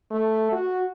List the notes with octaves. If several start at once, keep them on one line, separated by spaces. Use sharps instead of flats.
A3
F#4